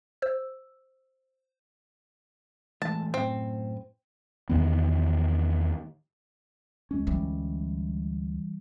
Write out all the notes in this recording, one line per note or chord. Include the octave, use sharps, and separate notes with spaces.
C5 E6
E3 G#3 A3 A5
F#2 A2 C4
E2 D#3 B3
D2 G#3 C#4
E3 G3